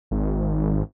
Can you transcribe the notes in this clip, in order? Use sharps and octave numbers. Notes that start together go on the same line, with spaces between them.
G#1